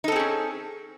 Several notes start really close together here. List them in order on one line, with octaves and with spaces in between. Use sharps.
D#4 A4 C4 G#4 C#4